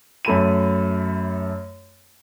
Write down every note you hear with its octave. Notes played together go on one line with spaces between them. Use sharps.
F#2 A3 B5 D#7